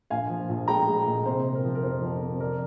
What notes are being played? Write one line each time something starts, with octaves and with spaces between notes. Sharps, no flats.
A#1 F5 G#5
F3
A#1
G#3 G5 A#5
G#3
A#2
C3 C5
C3
A#4
F3
A#4
F2 C5
F2
C3
F3 A#4 D5